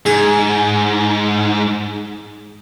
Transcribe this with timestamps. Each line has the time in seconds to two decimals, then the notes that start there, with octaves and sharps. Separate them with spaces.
0.06 G#2 G#4